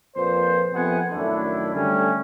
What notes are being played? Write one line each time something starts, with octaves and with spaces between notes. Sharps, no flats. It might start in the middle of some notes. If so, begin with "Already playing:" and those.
F2 A#2 B4 C5
F2 C3 A#3 B3 F#5 G#5
F#2 A2 D#3 A3 D4 E4
D3 G3 A3 C#4